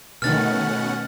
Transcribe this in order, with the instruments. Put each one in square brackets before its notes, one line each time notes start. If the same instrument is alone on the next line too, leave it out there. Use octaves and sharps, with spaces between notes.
[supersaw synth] B2 C#4 F#5 [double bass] D#3 A3 [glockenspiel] F6 A6